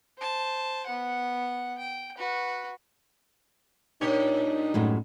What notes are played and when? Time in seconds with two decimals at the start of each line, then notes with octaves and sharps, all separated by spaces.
0.18 C5 A5
0.86 B3 F#5
1.78 G5
2.18 F#4 B4
4.01 A#2 D4 D#4 G4 C#5
4.74 F#2 A2 G#3